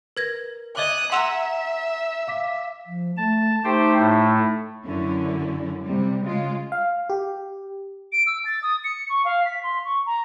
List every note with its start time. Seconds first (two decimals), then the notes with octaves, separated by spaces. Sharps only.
0.17 A#4 B4 G#6 A#6
0.77 D#5 E5 D6 D#6 F#6 G#6 F#7 G7
1.12 E5 F#5 G#5 A#5 C6 E6 E7 F7
2.27 F5 D6 B6
2.87 F3
3.17 A3 A5
3.64 A3 D#4 G4 C5 G5
3.98 A2
4.84 F#2 D3 C#4 E4
5.83 C3 G3
6.22 C#3 G#3 F4
6.72 F5
7.09 G4
8.13 D7
8.27 E6
8.45 A6
8.63 D#6
8.84 C#7
9.10 C#6
9.25 F5
9.46 B6
9.63 C6
9.85 C#6
10.06 A#5